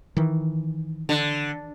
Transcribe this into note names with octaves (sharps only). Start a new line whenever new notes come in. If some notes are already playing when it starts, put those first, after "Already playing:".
D#3 E3
D3